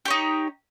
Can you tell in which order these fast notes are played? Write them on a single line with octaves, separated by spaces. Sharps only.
G4 C#5 D#4